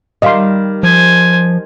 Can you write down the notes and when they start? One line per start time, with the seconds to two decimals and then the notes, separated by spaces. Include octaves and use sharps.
0.22 D#3 G3 D#5 F5 C6
0.83 F3 C5 G#5